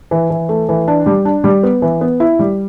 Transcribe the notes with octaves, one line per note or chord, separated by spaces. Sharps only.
E3
E3
A3
E3
D4
G3
D4
G3
B3
E3
B3
E4
G3